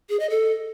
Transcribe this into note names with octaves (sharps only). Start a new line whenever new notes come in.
G#4
D#5
A4